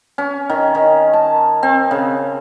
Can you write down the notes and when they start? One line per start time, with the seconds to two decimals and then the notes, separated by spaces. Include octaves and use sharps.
0.18 C#4
0.50 D#3
0.75 D#3
1.13 A5
1.63 C4
1.91 C#3